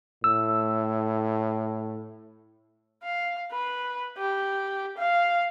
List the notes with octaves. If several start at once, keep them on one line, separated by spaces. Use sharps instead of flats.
A2 E6
F5
B4
G4
F5